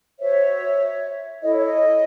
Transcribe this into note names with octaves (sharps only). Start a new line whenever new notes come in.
F#4 C5 C#5 E5
E4 A4 C#5 D#5
C#5
D#5